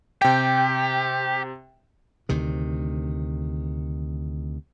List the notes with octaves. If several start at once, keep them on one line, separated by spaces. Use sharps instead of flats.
C3 G4 G5
D2 C3 D#3